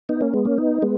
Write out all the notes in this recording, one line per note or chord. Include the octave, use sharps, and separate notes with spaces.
B3 D#4
A#3 C#4
G#3 B3
A#3 C#4
B3 D#4
G#3 B3